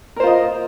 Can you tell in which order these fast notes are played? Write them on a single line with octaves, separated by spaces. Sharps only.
A#4 C5 F4 D#5